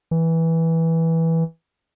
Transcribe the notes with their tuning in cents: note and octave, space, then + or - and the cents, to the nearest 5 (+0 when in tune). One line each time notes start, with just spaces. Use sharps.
E3 -10